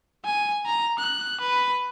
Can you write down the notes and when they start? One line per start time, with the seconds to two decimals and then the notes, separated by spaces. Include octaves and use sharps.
0.25 G#5
0.66 A#5
0.99 F#6
1.41 B4